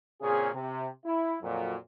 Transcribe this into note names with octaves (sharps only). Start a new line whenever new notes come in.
A#2 C#3 C4 C#4 G#4
C3
E4
F2 A#2 F#3